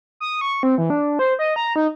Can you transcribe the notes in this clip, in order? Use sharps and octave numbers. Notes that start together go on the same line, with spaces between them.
D#6
C#6
C4
E3
D4
C5
D#5
A#5
D#4